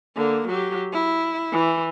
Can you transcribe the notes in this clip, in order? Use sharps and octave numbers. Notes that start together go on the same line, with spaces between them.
D3 A#3
F#3 G4
E4
E3